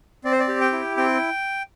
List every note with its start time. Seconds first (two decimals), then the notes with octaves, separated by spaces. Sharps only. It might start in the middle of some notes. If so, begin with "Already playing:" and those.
0.24 C4 D5
0.32 C5
0.39 D5
0.48 G4
0.61 G5
0.72 E4
0.97 C4 G5